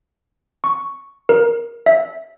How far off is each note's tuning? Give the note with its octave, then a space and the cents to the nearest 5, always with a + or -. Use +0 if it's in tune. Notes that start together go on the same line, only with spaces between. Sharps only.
C#6 +0
A#4 +10
E5 -15